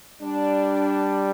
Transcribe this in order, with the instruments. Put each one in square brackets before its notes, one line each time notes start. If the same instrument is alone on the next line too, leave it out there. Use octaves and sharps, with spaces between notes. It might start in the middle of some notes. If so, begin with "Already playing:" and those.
[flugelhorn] G3 [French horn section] D4